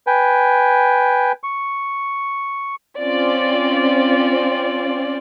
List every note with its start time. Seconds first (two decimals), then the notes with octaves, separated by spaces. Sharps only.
0.07 B4 G5 G#5
1.43 C#6
3.00 C4 C#4 F4 D5